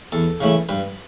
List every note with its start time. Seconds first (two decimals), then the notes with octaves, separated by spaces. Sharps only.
0.12 E2 A4
0.41 C#3 E3 A3 E4
0.69 G2 B4